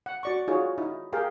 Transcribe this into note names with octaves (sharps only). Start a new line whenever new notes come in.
F#5
F#4 D5 C#6
D#4 F4 F#4 G#4 C#5
D#4 E4
G4 G#4 A#4 F5 G5